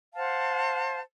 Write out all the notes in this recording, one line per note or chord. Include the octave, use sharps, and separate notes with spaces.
C5 F5 F#5 A5